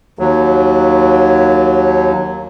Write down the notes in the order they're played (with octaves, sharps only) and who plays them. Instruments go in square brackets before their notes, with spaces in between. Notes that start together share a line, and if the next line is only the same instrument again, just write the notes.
[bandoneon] D#2 F#3